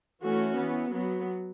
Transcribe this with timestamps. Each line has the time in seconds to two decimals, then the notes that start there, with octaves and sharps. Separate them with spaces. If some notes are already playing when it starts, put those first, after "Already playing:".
0.23 E3 A3 C#4 F#4
0.57 E3 B3
0.92 F#3 B3